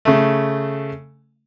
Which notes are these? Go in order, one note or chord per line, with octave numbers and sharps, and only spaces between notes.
C#3 A3